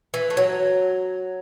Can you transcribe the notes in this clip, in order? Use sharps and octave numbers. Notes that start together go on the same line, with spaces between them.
E3
A3
F#3